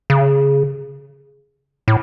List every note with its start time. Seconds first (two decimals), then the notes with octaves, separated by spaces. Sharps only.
0.10 C#3
1.88 A2